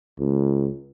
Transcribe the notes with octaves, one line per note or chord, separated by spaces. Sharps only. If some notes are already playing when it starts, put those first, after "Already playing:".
C#2